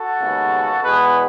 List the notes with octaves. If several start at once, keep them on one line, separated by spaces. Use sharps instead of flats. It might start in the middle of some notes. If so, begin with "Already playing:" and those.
Already playing: F#4 A4
D#2 C#3 G#3 B3
E2 B2 G#3 B3 G#4 B4